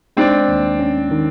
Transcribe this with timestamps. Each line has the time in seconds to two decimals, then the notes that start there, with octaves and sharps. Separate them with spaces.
0.17 G#3 C4 D4
0.48 D#2
0.79 C#4
1.11 D#3